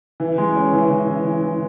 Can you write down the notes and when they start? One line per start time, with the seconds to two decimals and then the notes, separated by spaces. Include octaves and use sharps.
0.20 E3
0.38 G#3
0.56 C#4
0.73 E3
0.90 E3
1.07 E3
1.24 E3
1.43 E3